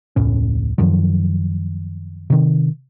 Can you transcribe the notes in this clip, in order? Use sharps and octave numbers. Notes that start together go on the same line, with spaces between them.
E1 C#2 A2 C#4
F#2 D#3 F3 F#3
C3 D#3